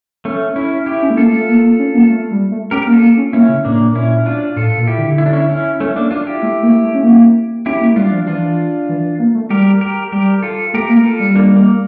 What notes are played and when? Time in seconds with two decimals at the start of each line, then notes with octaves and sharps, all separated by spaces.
0.25 A3 C#4
0.56 C#4 E4
0.86 E4 G4
1.02 C#4
1.10 A3
1.17 A#3 F4 A4
1.33 A3
1.48 A#3
1.64 A#3
1.79 C#4
1.94 A#3
2.10 A3
2.31 G3
2.51 A3
2.71 C#4 G4 A#4
2.87 A#3
2.93 F4 A4
3.02 A#3
3.17 C#4
3.33 A#3 C#4 E4
3.49 C#3
3.65 A2 A#3 D4
3.80 A#2
3.95 A#2 C#4 E4
4.26 D4 F4
4.56 A2 F4 A4
4.78 A#2
4.87 E4 G4
4.98 D3
5.18 E4
5.26 D4
5.33 C#4 E4
5.49 C#4 E4
5.80 A3 C#4
5.96 A#3 D4
6.11 D4 F4
6.26 E4 G4
6.43 A3
6.63 A#3
6.84 A3
6.95 C#4
7.04 A#3
7.66 C#4 E4 G4
7.81 A#3
7.93 A3
7.96 G3 D4 F4
8.12 F3
8.27 E3 D4 F4
8.89 E3
9.19 A#3
9.35 A3
9.50 G3 G4 A#4
9.81 G4 A#4
10.12 G3 G4 A#4
10.43 F4 A4
10.74 A3 G4 A#4
10.89 A#3
10.96 A#4
11.05 F4 A4
11.20 G3
11.36 A#3 D4
11.56 A#3